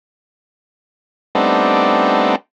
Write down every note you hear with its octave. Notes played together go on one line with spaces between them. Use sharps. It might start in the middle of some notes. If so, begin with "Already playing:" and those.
G3 A3 B3 C4 D4 D#4